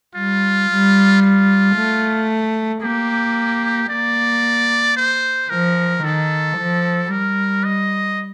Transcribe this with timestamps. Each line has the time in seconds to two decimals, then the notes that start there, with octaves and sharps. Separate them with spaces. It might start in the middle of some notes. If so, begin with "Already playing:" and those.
0.15 G3 F4
0.69 G3
1.22 F4
1.75 A3
2.82 A#3 G4
3.89 A#3 D5
4.96 C5
5.50 F3 A#4
6.03 D#3 A4
6.58 F3
7.10 G3 A#4
7.65 D#5